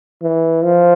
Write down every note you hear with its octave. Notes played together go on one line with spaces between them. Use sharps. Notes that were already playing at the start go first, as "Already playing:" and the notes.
E3
F3